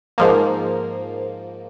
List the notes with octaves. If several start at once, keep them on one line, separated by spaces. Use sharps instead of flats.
G#2 F3 A#3